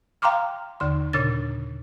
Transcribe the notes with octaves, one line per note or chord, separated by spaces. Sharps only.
F5 G5 A#5 C6 D6 F6
D#2 D3 C6
A#2 C#3 D4 A6